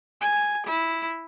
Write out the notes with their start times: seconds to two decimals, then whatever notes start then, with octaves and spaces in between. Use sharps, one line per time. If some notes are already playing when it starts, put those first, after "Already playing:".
0.21 G#5
0.67 E4